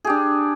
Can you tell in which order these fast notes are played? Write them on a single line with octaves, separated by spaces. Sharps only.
G#4 G4 D4